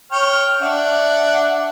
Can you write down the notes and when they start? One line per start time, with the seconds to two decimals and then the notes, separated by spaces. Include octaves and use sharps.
0.12 C#5 G5 F6
0.61 D4 E5 F#5